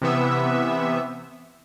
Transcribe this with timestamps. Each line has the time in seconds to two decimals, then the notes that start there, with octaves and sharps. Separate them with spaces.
0.02 C3 E3 B3 E5